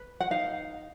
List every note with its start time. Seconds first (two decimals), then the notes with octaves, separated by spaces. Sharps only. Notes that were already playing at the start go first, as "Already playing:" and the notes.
Already playing: B4
0.20 F#5
0.31 D#4 F5